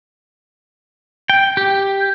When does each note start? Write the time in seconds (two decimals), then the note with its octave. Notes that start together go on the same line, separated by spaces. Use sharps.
1.30 G5
1.57 G4